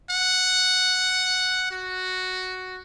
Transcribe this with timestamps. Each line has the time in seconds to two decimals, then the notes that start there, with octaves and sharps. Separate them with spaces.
0.11 F#5
1.71 F#4